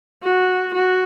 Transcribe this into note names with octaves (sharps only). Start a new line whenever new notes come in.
F#4
F#4